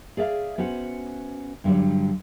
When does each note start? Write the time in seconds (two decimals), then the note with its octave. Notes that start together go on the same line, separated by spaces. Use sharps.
0.17 G#4 D5 E5 F5
0.58 B3 C#4 F#4 C5 F#5
1.64 G2 D3 F#3 G3